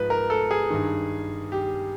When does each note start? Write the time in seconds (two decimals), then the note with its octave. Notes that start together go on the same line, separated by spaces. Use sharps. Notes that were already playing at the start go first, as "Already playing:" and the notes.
Already playing: G#2 F3 B4
0.10 A#4
0.30 A4
0.51 G#4
0.70 G2 D#3
1.52 G4